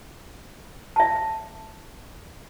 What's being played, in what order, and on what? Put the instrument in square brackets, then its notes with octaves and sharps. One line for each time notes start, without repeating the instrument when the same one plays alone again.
[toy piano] E5 A5